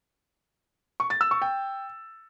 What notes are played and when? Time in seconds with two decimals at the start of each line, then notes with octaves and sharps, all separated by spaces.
1.00 C#6
1.10 A6
1.21 E6
1.31 C#6
1.42 G5